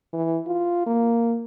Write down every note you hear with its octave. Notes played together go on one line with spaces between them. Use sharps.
E3
F4
A#3